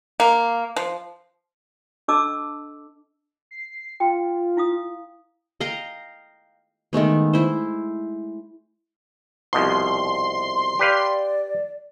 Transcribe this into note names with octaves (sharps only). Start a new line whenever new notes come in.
A#3
F3
D4 A4 D#5 A5 D6 E6
C7
F4 G5
E4 F5 D#6
D#5 F5 G5 A#5
D#3 G#3 A3 B3
E4 C5
C2 B2 F3 C6
G4 B4 D5 F5